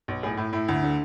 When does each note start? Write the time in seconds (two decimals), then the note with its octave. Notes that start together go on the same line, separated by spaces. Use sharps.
0.08 B1
0.23 A2 G#4
0.37 A2 E4
0.53 A2 E4
0.68 D2
0.83 D3